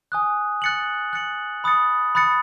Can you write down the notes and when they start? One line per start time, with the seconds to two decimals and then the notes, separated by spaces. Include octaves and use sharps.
0.12 G#5 D#6 F#6
0.62 F#6 A6 C#7 F#7
1.13 F#6 A6 C#7 F#7
1.64 B5 D#6 F#6 A6 C#7
2.15 B5 D#6 F#6 A6 C#7